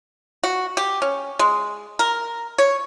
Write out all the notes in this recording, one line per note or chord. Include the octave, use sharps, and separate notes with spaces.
F#4
G4
C#4
G#3
A#4
C#5